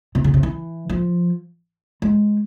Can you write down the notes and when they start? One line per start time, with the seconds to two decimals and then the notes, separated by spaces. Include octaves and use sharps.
0.15 C3
0.24 C#3
0.34 C3
0.43 E3
0.89 F3
2.02 G#3